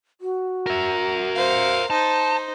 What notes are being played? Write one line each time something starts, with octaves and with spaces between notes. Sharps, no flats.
F#4
A#4 E5
C5 F5
D#4 C5 A5